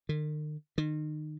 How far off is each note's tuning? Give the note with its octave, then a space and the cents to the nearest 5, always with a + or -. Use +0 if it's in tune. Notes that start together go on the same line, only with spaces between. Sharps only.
D#3 -45
D#3 -30